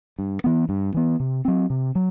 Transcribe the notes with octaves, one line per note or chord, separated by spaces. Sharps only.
G2
E3 B3
G2
E3 B3
C3
F#3 C4
C3
F#3